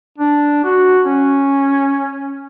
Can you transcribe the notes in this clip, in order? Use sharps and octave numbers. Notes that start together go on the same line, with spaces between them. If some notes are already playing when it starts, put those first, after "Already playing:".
D4
F#4
C#4